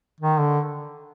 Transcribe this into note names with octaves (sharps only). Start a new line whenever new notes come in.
D#3
D3